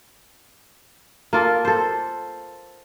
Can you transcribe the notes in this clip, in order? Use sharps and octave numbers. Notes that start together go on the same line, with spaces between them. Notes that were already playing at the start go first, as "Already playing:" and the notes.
A#3 F4 A4
A4 C5